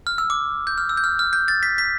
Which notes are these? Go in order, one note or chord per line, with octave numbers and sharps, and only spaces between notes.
F6
E6
D6
G6
F6
E6
G6
F6
F6
G6
A6
B6
B6